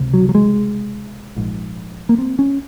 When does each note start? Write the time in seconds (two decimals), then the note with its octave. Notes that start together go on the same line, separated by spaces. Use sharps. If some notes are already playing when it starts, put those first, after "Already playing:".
Already playing: C#2 C3
0.13 F#3
0.29 F#3
0.35 G#3
1.36 A#1 G#2
2.09 A#3
2.18 C4
2.39 C#4